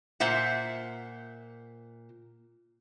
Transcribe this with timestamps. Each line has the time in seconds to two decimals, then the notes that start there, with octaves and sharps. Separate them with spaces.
0.20 A#2 C5 E5 F#5